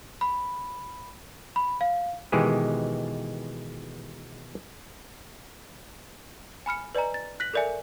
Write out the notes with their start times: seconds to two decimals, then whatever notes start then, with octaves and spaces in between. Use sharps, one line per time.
0.21 B5
1.56 B5
1.81 F5
2.32 B2 D#3 E3 G#3 G4 G#4
6.66 G#5 B5 F6 C#7
6.95 B4 D5 D#5 G#5 A#5
7.14 A6
7.40 F#6 A#6 B6 F#7
7.54 A4 A#4 D5 E5 G#5